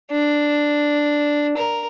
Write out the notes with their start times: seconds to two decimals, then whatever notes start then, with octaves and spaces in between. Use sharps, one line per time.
0.12 D4
1.57 A#4